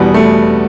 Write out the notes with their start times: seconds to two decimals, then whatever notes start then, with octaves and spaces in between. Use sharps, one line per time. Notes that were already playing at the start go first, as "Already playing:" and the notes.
Already playing: E2 B2 G3 B3
0.14 A3